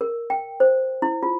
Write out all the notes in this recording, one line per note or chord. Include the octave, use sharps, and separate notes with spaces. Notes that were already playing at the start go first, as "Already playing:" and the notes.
A#4
G5
C5
E4
F4